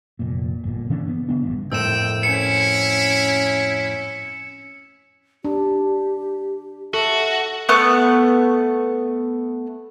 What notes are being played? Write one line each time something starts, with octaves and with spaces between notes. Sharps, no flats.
F1 A#2
G1 A#2
C#3 E3 C#4 D4
B3
C#3 B3 D4
A1 G2
F2 A2 A#4 G5 E6 E7
C#4 E4 C#7
D4 G4
F#4 A4 E5
A3 B3 C#6 F#6